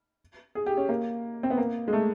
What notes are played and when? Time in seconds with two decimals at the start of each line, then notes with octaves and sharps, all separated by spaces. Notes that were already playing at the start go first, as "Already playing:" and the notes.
0.55 G#4
0.66 G4
0.77 C#4
0.89 A#3
1.43 C4
1.50 B3
1.58 A#3
1.88 G#3
1.93 A3